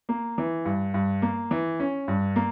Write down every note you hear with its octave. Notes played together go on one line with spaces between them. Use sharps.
A#3
E3
G2
G2
A#3
E3
C#4
G2
A#3